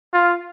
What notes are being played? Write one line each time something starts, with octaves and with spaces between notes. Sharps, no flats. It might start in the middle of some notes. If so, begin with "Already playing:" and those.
F4